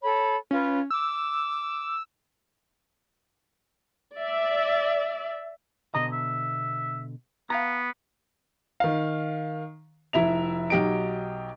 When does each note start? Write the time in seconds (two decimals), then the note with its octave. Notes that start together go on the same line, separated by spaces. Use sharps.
0.02 A4 C#5 B5
0.51 C#4 F4 B4
0.90 D6 E6
4.16 D5 E5
5.95 B2 D3 D#5 A#5
6.13 E5
7.50 B3 F5 G5 A#5
8.80 D#3 F5
10.13 F1 E4 E5 F7
10.70 B1 F#3 G4 D#5 D7